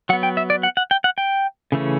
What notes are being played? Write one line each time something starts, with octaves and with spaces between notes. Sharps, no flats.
F#3 B3 F#5
G5
E5
D5
F#5
F#5
G5
F#5
G5
C#3 E3 A3 C#4